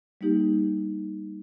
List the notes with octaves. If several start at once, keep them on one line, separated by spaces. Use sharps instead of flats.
G3 A#3 D#4 G4